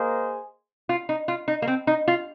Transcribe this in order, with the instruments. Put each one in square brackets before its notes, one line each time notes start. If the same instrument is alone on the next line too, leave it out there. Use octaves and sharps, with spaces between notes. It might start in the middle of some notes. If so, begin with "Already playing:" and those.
Already playing: [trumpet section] A#3 G#4 C5 D#5
[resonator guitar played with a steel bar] F4
D#4
F4
D#4
A#3
C4
D#4
F4